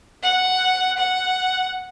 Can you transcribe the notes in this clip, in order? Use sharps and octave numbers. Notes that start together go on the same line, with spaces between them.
F#5
F#5